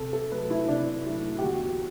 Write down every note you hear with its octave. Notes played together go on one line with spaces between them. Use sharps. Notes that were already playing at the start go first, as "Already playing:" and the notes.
Already playing: C3 A4
A4
F#3 A3 B4
E4
C3 D4
F#3 A3 E4
G4
E2 F#4